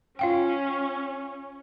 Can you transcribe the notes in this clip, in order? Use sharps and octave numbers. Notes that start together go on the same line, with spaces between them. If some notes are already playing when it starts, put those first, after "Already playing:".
C#4 F4 F5 G5